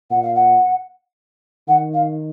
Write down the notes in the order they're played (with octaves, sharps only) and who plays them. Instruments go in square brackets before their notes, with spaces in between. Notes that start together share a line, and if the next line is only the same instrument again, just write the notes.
[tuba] A#2 [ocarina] F#5
[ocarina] F5
F#5
[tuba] D#3 [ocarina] F#5
[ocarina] F5